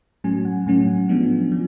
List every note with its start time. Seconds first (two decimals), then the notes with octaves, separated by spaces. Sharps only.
0.24 A2 F#3 A3 C#4 G#5
0.45 F#5
0.66 A2 F#3 A3 C#4 G#5
1.09 F3 G#3 B3 D4
1.52 F3